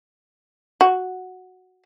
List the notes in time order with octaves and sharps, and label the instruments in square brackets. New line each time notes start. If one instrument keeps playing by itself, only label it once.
[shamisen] F#4